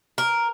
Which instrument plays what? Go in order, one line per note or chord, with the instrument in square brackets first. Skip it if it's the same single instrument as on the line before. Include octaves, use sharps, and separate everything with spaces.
[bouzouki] A#4